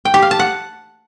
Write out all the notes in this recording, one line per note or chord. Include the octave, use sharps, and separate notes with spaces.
G5
G4
F5
A5
F#5